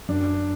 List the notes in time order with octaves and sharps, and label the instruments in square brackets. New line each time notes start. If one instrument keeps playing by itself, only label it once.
[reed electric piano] F#2 [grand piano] D4